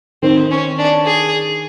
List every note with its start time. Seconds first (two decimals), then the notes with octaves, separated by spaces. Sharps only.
0.22 D#3 C4
0.51 C#4
0.78 D4
1.06 G#4